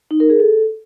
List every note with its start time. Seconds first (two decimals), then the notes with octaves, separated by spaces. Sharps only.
0.11 D#4
0.20 A#4
0.30 G#4
0.39 A4